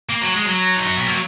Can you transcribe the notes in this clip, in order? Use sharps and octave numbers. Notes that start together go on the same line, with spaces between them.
A#3
F#3
G#3
F#3
D#4
C#4
B3
A#3